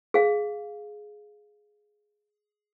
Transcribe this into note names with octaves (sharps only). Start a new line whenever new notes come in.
G#4 F5